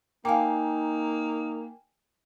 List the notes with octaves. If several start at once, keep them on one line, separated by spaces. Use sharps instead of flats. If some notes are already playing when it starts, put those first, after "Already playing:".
A#3 D#4 F5 G5 G#5 D6